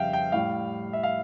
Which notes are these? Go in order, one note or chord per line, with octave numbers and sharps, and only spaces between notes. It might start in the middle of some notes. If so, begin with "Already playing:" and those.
Already playing: F2 C#3 G3 E5 F5 G5
G5
A2 G3 F5
E5
F5